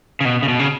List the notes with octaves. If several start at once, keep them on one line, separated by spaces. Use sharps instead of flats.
C#3
B2
C#3
B2
C#3